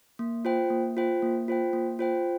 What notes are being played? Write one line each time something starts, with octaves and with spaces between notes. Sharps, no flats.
A#3
F4 C5 G5
A#3
F4 C5 G5
A#3
F4 C5 G5
A#3
F4 C5 G5